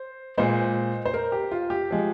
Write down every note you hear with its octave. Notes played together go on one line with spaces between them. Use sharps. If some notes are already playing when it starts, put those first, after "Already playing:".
Already playing: C5
A#2 G#3 C5
C5
A#4
G4
F4
G4
F3 G#3